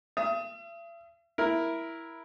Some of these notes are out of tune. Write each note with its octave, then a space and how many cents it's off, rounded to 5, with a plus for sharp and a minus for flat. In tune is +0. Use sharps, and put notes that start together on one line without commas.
E5 +45 D#6 +25
E4 +0 A#4 +10